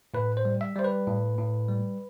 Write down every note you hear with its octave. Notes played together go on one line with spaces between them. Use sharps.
A2 B4
C5
G3
E5
G3 C5
B4
A2
A2
G3